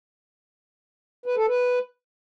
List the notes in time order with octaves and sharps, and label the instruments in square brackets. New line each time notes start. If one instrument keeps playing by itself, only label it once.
[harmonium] B4
A4
B4